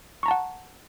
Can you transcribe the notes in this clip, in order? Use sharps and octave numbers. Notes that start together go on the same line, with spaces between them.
F#5 A5 A#5 C#6